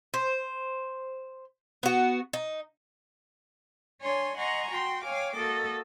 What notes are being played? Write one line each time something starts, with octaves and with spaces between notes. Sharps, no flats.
C5
B3 F#4
D#4
D4 C#5 G#5 C6
D#5 F#5 G#5 A#5 C6 C#6
F#4 G5 C6
C#5 F5 G5 G#5 D6
A#3 F#4 A4 D#5